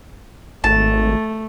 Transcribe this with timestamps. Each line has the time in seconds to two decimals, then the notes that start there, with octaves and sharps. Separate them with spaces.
0.64 G#1 A3 A5